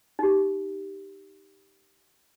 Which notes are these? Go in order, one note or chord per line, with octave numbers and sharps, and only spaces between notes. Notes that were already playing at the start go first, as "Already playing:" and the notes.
D#4 G4